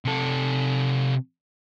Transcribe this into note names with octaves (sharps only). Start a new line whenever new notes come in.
C3 A4